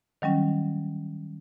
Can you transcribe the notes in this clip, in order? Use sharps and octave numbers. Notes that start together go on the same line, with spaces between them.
D#3 F#3 G3 C#4